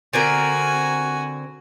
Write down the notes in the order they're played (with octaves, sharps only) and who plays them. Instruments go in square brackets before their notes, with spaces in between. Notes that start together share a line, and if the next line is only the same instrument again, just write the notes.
[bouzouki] D3 C4 A#4 [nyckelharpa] F#4 G#5